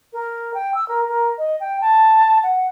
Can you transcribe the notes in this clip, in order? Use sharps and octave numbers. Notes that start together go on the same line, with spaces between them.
A#4
G5
E6
A#4
A#4
D#5
G5
A5
F#5